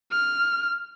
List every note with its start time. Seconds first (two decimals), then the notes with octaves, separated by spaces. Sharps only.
0.11 F6